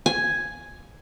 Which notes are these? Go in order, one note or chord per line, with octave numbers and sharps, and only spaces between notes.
G#5